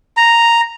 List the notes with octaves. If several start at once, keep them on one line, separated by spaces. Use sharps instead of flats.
A#5